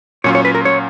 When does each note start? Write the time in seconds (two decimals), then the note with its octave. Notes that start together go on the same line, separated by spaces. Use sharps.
0.24 A#2 F#3 C#4 F4 C#5
0.35 C#5
0.45 B4
0.55 A#4
0.65 C#5